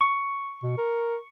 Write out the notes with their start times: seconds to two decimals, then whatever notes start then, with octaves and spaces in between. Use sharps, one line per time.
0.01 C#6
0.63 B2
0.78 A#4